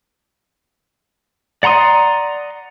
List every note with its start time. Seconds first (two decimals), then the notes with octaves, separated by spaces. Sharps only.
1.63 D5 F#5 A#5 C6 D#6